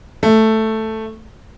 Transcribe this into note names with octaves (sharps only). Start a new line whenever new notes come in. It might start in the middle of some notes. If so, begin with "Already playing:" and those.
A3